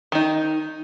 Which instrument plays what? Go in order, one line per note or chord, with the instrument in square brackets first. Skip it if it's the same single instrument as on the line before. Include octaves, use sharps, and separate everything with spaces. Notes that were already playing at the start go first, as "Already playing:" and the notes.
[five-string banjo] D#3 D#4